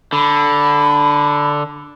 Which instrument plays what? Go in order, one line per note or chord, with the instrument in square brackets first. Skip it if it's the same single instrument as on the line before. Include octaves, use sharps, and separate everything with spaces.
[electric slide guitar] D3 [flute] B5